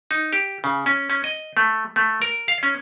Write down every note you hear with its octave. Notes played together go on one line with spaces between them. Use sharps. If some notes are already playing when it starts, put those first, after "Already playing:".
D#4
G4
C#3
C#4
C#4
D#5
A3
A3
A#4
F5
C#4